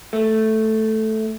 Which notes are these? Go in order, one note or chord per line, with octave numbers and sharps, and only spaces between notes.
A3